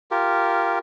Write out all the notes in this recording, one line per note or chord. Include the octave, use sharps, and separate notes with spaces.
F4 G4 A#4